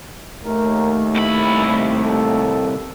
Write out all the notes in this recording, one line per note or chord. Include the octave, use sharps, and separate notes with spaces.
D#2 A3 A#4
C2 E4 B5
A4